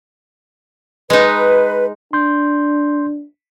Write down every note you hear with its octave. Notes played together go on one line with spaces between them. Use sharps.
G#3 D#4 B4
D4 C6 G6